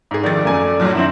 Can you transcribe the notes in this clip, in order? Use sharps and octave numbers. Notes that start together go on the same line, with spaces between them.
G#2 G#4
F2 A#2 D#3 D5 A6
F#2 A3 G#5
A2 F#3
F#2 D#3 C4 E4